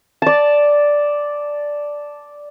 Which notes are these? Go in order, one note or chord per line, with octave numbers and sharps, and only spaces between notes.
D5 A5